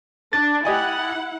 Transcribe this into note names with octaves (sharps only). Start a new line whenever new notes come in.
D4 A6
E4 G4 D#5 F#5 G#5